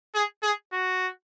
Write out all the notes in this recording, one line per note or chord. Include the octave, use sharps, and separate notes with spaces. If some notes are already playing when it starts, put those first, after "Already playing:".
G#4
G#4
F#4